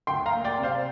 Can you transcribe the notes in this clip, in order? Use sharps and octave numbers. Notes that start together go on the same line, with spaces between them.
D2 G5 C6
F5 A#5
A#3
D5 G5
C3
C5 F5